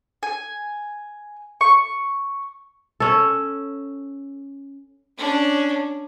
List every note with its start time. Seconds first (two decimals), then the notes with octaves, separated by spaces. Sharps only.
0.23 G#5
1.61 C#6
3.00 C#4 A4
5.18 C#4 D4